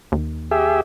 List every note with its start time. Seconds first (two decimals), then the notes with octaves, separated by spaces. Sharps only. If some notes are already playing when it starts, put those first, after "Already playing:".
0.12 D#2
0.51 G4 G#4 E5